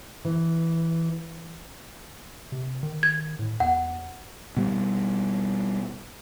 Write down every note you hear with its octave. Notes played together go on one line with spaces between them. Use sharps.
E3
C3
D#3
G#6
A2
E2 F#5
B2 G3